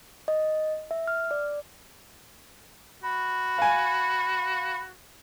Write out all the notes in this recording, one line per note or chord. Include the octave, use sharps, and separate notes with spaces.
D#5
E5
F6
D5
F#4 B5
F5 G#5